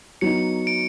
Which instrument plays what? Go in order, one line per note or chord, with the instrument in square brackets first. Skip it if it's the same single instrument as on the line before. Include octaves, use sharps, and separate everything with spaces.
[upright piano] F#3 B3 D#4 [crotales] C#7
[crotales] D7